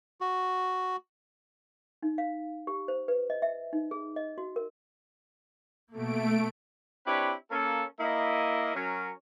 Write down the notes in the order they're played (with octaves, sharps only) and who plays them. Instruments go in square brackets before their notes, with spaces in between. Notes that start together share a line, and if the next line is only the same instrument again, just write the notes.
[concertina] F#4
[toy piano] D#4
F5
G4
C5
B4
D#5
E5
D#4
G#4
D#5
F#4
A#4
[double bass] B2 A#3 [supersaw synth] A3 D7
[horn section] C4 D4 E4 G4 B4 C#5
A#3 C#4 A4
A#3 E4 D#5
F#3 C#4 A#4